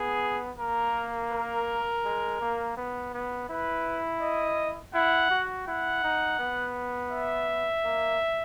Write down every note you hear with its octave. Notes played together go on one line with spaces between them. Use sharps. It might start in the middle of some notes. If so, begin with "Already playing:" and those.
Already playing: B3 G#4
A#3 A#4
A#4
G#3
A#3
B3
B3
E4 B4
D#5
E4 F#5
F#4
E4 F#5
D#4
B3
E5
A#3